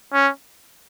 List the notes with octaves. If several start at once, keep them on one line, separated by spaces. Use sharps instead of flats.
C#4